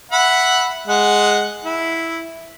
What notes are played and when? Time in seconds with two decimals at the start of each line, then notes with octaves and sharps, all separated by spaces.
0.12 E5 F#5 B5
0.87 G#3 F#5
1.65 E4